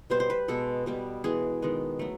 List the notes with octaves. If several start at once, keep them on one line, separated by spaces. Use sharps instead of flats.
B2 G3 B3 C5
C5
B4
B2 G#3 B3 A4
B2 G3 B3
E3 G#3 B3 G#4
D#3 G#3 B3
F#3 A3